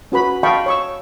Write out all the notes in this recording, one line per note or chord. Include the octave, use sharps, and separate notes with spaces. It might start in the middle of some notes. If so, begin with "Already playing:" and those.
C#4 F#4 B4 B5
D#5 F5 G5 A5 B5 C#6
C#5 C#6 E6